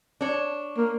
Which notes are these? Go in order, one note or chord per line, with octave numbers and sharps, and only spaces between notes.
D4 C#5
A#3